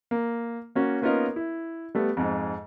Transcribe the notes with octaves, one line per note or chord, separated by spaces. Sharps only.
A#3
A#3 C#4 F#4
A#3 B3 C#4 D#4 F4 A#4
E4
G3 A3 B3
F2 G#2